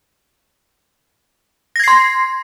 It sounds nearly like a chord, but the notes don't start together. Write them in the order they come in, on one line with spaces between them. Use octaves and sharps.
A#6 G#6 C7 C6